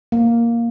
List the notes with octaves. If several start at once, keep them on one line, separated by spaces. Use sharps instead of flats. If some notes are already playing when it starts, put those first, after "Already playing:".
A#3